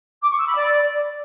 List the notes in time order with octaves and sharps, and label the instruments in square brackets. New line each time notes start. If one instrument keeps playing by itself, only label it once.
[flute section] D6
C#6
E6
B5
D5